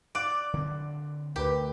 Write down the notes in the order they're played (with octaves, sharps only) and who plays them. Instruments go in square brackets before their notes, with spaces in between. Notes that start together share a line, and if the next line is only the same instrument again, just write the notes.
[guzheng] D5 [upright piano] D6 F#6 D7
[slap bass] D3 C4
[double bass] D2 [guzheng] G4 [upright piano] A#4 B4